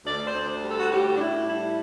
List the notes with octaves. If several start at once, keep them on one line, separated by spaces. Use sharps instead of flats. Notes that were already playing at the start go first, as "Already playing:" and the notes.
D2 D5
C5
D2
G3
A4
F#4
A2 G4
D4
A2 E4
G3 E4